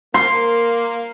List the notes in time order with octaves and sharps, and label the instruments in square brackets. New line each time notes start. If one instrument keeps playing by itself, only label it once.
[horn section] A#3 [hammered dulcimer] C6